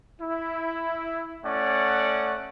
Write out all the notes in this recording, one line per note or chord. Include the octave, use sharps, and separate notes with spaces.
E4
A3 C#4 D5 F#5